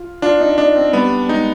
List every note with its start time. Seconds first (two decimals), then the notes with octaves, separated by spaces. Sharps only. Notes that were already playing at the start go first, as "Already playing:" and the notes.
Already playing: F4
0.22 D4 F4
0.40 D#4
0.58 D4 D#4
0.76 C4
0.93 G3 B3
1.28 G#3 D#4